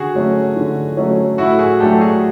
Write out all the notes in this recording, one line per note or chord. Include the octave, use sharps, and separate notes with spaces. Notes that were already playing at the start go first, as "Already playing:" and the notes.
Already playing: D3 F#4 G#4
F#3 A3 C#4
D3
F#3 A3 C#4
A2 E4 F#4
F#4 G#4
F#3 A3 D4 G4 A4
F#4 G#4